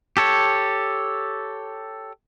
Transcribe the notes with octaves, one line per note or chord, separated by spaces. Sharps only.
G4 A4 C#5